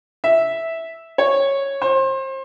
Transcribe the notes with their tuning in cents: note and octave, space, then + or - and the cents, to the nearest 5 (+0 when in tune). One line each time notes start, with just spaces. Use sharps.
E5 -10
C#5 -10
C5 +30